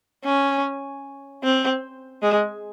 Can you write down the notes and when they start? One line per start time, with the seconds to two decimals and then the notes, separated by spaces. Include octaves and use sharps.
0.25 C#4
1.43 C4
2.22 G#3